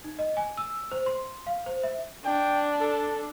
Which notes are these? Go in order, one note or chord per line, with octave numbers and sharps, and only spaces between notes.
D#4
D#5
G#5
E6
C5
C6
F5
C5
E5
D4 G5
A4